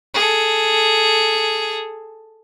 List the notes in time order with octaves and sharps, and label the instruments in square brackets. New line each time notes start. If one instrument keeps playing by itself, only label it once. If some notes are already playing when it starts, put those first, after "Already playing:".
[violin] G#4 A4